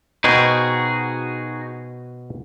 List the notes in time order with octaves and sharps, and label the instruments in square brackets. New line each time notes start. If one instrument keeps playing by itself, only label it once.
[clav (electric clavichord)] B2 C5 G5 [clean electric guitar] D#4 F#4 G#4